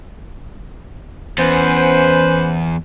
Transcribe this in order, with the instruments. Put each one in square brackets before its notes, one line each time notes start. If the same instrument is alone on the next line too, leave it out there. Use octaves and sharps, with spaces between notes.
[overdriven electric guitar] E2 [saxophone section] C#4 B4 C5